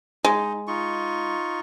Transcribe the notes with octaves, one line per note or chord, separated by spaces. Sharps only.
G#3 D#4
D#4 F4 C#6